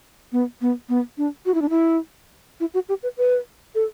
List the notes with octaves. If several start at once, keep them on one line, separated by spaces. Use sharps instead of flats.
B3
B3
B3
D4
F#4
E4
D4
E4
E4
F#4
G4
B4
B4
A4